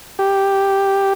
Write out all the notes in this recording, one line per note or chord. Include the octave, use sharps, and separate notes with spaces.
G4